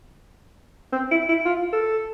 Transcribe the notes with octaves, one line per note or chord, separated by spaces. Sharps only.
C4
E4
E4
F4
A4